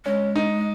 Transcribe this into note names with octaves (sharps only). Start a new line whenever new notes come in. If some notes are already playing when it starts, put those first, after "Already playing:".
G#3 C#4
D#4